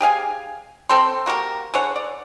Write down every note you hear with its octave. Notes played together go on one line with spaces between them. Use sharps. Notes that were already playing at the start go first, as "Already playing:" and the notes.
G4 G#4 F5 G#5
C4 A4 G5 C6
A#3 F#4 G4 A#4
D3 G#4 C#5 F#5
D5